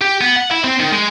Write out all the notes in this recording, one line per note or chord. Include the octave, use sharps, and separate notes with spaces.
G4
B3
F#5
E4
C4
D#3
G#3